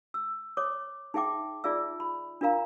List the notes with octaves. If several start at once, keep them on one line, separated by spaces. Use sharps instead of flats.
E6
C#5 D6 D#6
D#4 G#4 E5 G5 D6
D#4 F4 G#4 D5 E5 E6
B5
D4 F4 A#4 F5 A#5